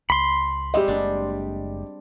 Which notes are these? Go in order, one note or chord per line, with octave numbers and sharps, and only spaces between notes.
C#2 B5 C6
G3 G#3 C4 G4 D#5
F#1 G#3 A#3 D4